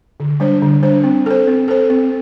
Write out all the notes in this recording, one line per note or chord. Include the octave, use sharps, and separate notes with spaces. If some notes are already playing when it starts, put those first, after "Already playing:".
D3
G3 D4 C5
D3
G3 D4 C5
C4
A4 C5
C4
A4 C5
C4